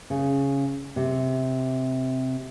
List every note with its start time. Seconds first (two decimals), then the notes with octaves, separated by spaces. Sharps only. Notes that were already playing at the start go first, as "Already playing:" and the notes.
0.10 C#3
0.96 C3